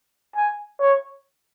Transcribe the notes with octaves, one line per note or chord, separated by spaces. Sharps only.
G#5
C#5